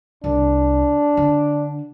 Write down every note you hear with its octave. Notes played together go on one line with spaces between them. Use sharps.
C2 D4
D3